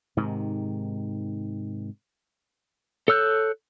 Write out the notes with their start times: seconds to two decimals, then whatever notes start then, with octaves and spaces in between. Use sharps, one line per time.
0.17 G#2 C3 D#3
3.08 A4 C#5 E6 F#6 G6